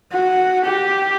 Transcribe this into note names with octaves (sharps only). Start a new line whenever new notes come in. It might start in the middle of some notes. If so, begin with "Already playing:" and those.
F#4
G4